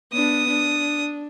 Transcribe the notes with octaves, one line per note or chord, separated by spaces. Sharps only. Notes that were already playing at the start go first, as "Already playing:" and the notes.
B3 D4 D#6
D4